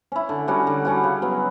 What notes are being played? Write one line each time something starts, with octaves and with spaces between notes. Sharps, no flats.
C#4 E4
D3
G3 C#4 F#4
D3
G3 C#4 F#4
C#3
F#3 B3